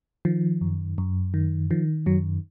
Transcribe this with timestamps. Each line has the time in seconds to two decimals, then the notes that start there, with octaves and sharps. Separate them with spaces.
0.25 D#3 F3
0.61 F#2
0.98 F#2
1.34 D#3
1.71 D#3 F3
2.06 F#2 F#3